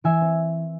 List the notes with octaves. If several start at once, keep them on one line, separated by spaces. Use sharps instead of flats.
E3 E5 G#5
C4